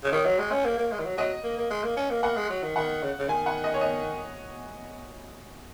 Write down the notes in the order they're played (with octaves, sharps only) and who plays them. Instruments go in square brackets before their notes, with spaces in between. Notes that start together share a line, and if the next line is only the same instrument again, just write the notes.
[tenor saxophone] C#3
[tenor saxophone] D#3 [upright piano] C#5
[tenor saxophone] F#3
G#3
C#4
A#3
A#3
G#3
D#3
F#3
[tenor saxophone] F#3 [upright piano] D#5
[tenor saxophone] A#3
A#3
G#3
A#3
C#4
A#3
[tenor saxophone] A#3 [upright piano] F#5
[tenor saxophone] G#3
F#3
D#3
[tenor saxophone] D#3 [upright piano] F#5
[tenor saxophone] C#3
C#3
[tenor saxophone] D#3 [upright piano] G#5
[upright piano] F#5
D#5
C#5
D#5